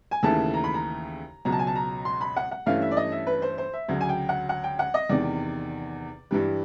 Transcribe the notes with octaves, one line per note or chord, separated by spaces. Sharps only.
G#5
D#2 C#3 E3 A3 A5
A#5
B5
A#5
C#2 B2 F#3 A#5
A5
G#5
A5
A#5
C6
B5
F#5
F#5
G2 E3 A3 C#4 F5
E5
D5
D#5
E5
B4
C5
C5
E5
D2 C#3 F#3
G#5
G5
F#5
F#5
G5
F#5
D#5
E2 C3 D#3 D5
G2 E3 G3